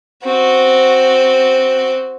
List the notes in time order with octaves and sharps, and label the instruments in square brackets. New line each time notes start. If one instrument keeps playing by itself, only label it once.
[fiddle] C4 F#4